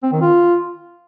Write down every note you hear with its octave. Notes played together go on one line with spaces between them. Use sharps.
C4
D#3
F4